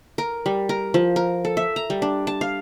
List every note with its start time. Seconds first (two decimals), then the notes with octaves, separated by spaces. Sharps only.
0.18 A#4
0.46 G3
0.69 A#4
0.94 F3
1.16 A#4
1.45 A4
1.57 E5
1.76 A#5
1.90 G3
2.02 D4
2.27 A5
2.41 F5